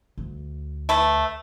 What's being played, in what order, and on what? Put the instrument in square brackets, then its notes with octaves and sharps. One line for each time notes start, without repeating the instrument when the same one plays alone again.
[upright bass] D2
[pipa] A3 B4